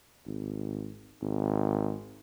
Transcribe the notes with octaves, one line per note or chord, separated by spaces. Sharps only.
G#1
G#1